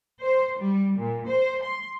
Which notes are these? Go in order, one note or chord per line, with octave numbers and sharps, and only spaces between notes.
C5
G3
A#2
C5
C6